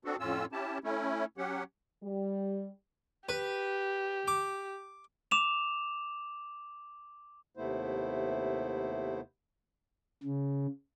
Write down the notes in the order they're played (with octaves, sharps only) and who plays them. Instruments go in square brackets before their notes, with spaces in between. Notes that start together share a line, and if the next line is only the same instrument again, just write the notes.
[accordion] B3 C4 D4 F#4 A4
F2 A2 C#4 F4 E6
C#4 E4 G4 A5
A3 C#4 E4
F#3 C#4 G4 F#5
[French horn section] G3
[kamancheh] G4 [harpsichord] B4
[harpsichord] D6
[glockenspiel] D6 E7 F7
[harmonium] D#2 C3 A3 B3 E4 C5
[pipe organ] C#3